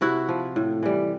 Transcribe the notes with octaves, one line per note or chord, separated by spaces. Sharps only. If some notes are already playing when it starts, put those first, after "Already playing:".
C3 E4 F#4
F3
A2
E3 G3